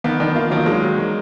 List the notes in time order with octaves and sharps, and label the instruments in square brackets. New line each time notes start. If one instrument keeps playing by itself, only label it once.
[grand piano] D#3 [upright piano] B3
[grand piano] D#3 [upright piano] D4
[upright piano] A#3 [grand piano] F4
[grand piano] D#3 [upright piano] F#3
[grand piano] D#3 [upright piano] G#3
[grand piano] F#3
D#3